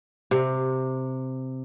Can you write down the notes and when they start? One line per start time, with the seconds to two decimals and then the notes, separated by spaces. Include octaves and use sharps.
0.31 C3